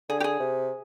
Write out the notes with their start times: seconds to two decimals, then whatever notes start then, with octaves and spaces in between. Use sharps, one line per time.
0.09 D3 G#4
0.20 G4
0.24 G#4
0.40 C3